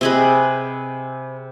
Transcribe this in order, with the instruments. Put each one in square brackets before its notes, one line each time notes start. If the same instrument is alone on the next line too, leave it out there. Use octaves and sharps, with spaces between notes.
[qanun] C3 D#5 B5 [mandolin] C4 G#4 B4